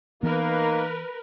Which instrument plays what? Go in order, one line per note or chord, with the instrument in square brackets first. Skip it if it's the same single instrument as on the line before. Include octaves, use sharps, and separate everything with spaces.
[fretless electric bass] E3 B3 [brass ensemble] A#3 D#4 [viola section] A#4 B4